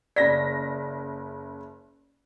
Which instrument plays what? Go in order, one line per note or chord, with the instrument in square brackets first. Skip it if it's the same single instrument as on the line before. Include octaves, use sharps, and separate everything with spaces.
[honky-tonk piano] F#1 A#6 B6 [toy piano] D5